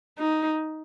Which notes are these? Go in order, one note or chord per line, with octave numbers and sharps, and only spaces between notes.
D#4